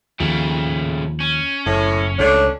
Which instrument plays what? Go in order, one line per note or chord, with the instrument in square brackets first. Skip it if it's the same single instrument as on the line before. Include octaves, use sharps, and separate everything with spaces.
[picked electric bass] D#2 F3 [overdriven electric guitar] C#3 A3
[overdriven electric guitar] C#4
[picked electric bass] F#1 [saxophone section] A2
[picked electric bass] C#2 [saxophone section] A3 D4 [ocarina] C#5